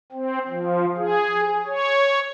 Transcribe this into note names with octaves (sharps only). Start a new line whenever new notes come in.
C4
F3
G#4
C#5